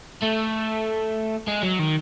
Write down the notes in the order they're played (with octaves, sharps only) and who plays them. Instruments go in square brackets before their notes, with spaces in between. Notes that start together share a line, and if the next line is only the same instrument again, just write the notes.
[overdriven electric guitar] A3
G#3
F#3
D#3